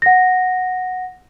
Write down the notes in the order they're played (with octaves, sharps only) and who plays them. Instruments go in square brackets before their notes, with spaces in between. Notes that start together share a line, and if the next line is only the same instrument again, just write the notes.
[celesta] F#5 A#6